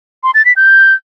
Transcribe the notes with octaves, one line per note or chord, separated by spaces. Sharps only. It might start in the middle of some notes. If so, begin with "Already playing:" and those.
C6
A6
B6
G6